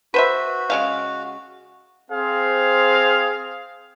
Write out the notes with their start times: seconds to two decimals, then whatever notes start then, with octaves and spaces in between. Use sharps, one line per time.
0.14 F#4 B4 C5 E5
0.70 C#3 G#3 F5
2.11 C4 G#4 C5 F5